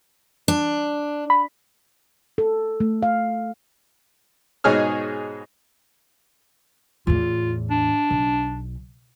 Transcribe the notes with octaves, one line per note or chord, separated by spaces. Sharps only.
D4
B5
A4
A3
F5
G#2 B2 D#4 G#4 C#5 F6
E2 A2 F4
D4
B1